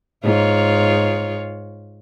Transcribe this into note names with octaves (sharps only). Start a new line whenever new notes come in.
G#2 F4 C#5